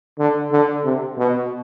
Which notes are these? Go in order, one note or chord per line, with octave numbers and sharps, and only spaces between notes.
D3
D3
C3
B2